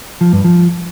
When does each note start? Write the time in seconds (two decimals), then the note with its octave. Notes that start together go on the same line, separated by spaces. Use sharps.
0.21 F3
0.33 G2
0.45 F3